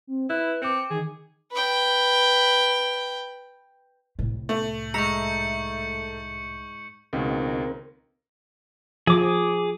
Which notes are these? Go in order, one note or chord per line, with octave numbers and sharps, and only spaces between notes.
C4
E4 B4 F#6
C4 G5 D6 C#7
D#3 G#4
B4 G5
C2 A2
A3 F#7
G#2 E5 A#5 C#6 G6 C#7
C#2 B2 D#3 C4 A#4
F3 G#4 D6